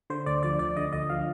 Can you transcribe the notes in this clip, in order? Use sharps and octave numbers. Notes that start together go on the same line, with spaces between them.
D3 C5
D2 D5
F3 D5
D2 D5
D3 D#5
D2 D#5
F3 F5